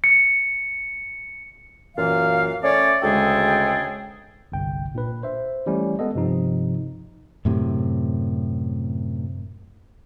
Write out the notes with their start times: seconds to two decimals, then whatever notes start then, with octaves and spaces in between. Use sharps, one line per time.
0.04 C#7
1.96 F#2 A#2 E3 F5
2.63 A3 C#4 C#5 D5
3.03 D2 C#3 G#3 G#4 A4 G5
4.52 G1 C2 G5
4.95 A#2 D4 B4
5.23 C5 E5
5.66 E3 G3 A3 C#4
5.99 G#3 B3 A4 D#5
6.15 G2 C3 F3 D#4
7.45 F#2 A2 C3